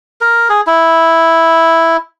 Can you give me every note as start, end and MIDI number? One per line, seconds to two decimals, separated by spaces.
0.21 0.48 70
0.50 0.61 68
0.67 1.97 64